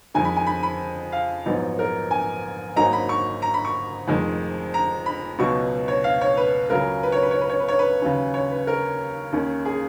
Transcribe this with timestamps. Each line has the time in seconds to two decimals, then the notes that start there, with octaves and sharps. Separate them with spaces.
0.14 F2 D#3 G#3 G#5
0.25 B5
0.36 G#5
0.46 B5
0.63 B5
1.12 F5
1.45 A#1 G#2 F#3 B3 D#4
1.79 A#4
2.11 G#5
2.76 G#1 G#2 F#3 A#3 D#4 A#5
2.93 B5
3.09 C#6
3.42 A#5
3.54 B5
3.65 C#6
4.08 F1 F2 D#3 G#3
4.74 A#5
5.06 B5
5.39 C#2 B2 F#3 B3 D#4 C#6
5.88 C#5
6.04 F5
6.21 C#5
6.37 B4
6.70 C#2 C#3 F#3 A#4
7.03 B4
7.12 C#5
7.22 B4
7.31 C#5
7.41 B4
7.50 C#5
7.60 B4
7.68 C#5
7.79 B4
8.02 D#2 C#3 F#3 C#4
8.34 C#5
8.51 B4
8.67 A#4
9.32 D#2 D#3 A#3 C#4
9.65 G#4